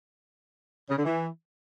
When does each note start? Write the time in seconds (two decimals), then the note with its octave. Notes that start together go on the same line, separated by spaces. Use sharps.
0.89 C#3
0.97 D3
1.05 E3